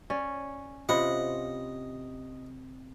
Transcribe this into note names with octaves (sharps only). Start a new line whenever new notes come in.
C#4 D5
C3 C#4 F4 D#5 F#5 B5